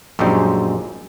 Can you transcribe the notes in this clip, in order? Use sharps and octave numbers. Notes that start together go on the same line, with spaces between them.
A#1 F#2 G3 G#3 D#4 C5